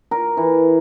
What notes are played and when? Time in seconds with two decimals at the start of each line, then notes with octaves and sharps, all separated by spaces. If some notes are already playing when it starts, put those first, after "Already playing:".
0.11 A#4
0.37 E3